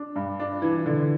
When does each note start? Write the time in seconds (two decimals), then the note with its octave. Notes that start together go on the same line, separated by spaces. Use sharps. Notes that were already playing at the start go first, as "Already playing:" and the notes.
Already playing: D4
0.16 G2
0.39 D4
0.62 E3
0.86 D3